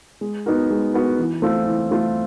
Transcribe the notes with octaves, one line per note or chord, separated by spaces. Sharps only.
G#3
B3 D#4 F#4 A#4
G#3
B3 D#4 F#4 A#4
E3
A3 C4 F4 A4
E3
A3 C4 F4 A4